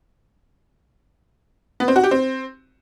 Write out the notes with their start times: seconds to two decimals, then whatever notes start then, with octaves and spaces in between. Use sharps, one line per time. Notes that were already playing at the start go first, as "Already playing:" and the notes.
1.80 B3
1.88 C4
1.96 F#4
2.03 G4
2.11 C4